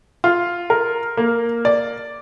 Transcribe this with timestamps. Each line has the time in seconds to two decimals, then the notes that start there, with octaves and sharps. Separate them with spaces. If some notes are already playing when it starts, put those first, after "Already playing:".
0.24 F4
0.70 A#4
1.17 A#3
1.65 D5